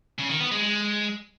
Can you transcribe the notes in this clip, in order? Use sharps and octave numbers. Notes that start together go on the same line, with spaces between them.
C#3
D#3
B3
G#3
G#3